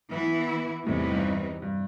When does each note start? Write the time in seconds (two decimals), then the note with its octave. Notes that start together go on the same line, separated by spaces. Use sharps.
0.11 E3 B3 E4
0.86 E2 A2 C3 E3 G3 D#4
1.11 G2
1.62 G2